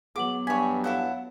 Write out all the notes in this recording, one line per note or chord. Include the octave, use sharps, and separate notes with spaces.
F#3 B3 G#4 F#5 D6 F#7
G2 C#5 G#5 C#6 B6
E4 A4 C#5 F5 F#5